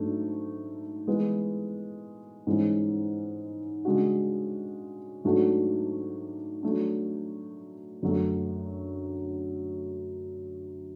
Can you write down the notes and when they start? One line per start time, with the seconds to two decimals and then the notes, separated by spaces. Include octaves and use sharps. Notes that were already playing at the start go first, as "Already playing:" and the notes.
Already playing: G#2 F#3 A3 D4
1.07 E3 G#3 B3
2.47 G#2 E3 G#3 C#4
3.85 C#3 G#3 D4 F#4
5.24 G#2 F#3 A3 D4 F#4
6.63 F#3 A3 D4
8.02 F#2 D3 F#3 A3